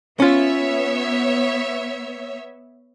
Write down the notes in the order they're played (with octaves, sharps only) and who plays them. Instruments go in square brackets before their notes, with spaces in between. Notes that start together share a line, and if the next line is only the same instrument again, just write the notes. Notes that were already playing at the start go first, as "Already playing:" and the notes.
[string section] B3 C#5 E5 [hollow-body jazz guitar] C#4 F4